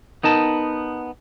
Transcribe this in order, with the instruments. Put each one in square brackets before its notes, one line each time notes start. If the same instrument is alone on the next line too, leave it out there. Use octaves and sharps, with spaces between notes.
[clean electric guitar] B3 D#4 A#4 A5